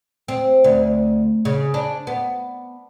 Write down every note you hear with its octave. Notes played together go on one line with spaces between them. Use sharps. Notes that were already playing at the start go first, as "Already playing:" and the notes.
C4
D2
C#3
D4
B3